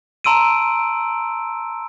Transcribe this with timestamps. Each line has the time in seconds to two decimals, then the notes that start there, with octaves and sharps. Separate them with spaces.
0.24 A5 A#5 C6 E6 D7 D#7